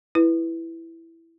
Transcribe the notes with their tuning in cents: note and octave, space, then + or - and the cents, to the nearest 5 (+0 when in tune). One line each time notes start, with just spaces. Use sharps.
E4 +5 B4 +0